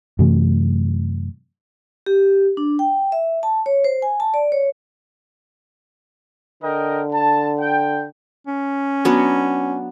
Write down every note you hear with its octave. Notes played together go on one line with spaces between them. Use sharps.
F#2 C3 E3 A3
G4
D4
G5
E5
A5
C#5
C5
G#5
A5
D5
C#5
D3 A#4 D#5 G5
A5
G5
C#4
F#3 B3 D4